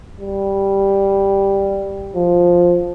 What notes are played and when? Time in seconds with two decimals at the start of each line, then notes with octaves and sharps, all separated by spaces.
0.20 G3
2.15 F3